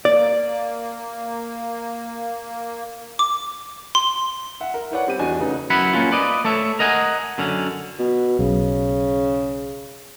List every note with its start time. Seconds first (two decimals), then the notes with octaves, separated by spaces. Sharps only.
0.05 A#3 D5
3.19 D6
3.95 C6
4.61 E5 F#5
4.74 A#4
4.91 E4 B4 C#5 D5 F#5
5.07 G3 C4 G4 D#7
5.19 E2 D4 F#4 D#5 G#5
5.39 F1 C#3 D#4 B4
5.70 F#2 E4 F#5 B5
5.94 A#3 C#4 F4
6.12 B4 D5 D#5
6.44 A3 A4 C#5 E5
6.79 A#4 D#5 F#5 G#5
7.38 F#2 D3 C#4
7.99 B2
8.39 B1 C#3